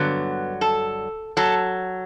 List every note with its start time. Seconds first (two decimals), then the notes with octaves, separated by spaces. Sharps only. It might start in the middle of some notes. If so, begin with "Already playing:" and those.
Already playing: G2 D3 F#3 B3
0.61 A4
1.37 F#3 A4